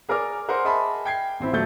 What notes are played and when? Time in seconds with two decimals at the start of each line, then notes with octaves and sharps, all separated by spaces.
0.09 G#4 A#4 D5 D6 F6
0.48 G#4 A#4 C5 F#5 C6
0.65 G#4 D#5 E5 A5 B5 C6
1.05 G5 G#6 C7
1.40 A1 C4 E4
1.52 D#1 A#1 F#3 A3 G6 A6